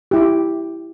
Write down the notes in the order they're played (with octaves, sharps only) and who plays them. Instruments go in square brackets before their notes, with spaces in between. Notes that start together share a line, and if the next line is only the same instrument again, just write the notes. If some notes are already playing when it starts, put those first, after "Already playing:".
[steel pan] E4 G4